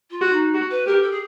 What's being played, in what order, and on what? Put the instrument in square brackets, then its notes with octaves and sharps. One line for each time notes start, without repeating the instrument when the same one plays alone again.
[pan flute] F4
[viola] F#4
[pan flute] D#4
[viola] F#4
[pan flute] B4
[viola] G4 [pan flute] A#4
[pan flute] A4
G#4